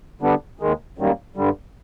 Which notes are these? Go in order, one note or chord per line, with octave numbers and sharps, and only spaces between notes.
D3 G3 B3 D4
D#2 D#3 G#3
F#2 D#3 G3 A#3
G2 D3 G3